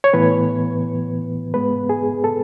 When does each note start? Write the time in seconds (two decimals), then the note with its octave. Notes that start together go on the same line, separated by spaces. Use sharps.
0.04 C#5
0.13 A2 E3 B3 B4
1.53 G#2 G#3 B3 B4
1.89 G#4
2.24 A4